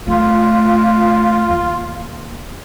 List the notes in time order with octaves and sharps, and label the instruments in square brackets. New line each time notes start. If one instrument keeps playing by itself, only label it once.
[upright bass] A3 [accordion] F4
[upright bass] D#2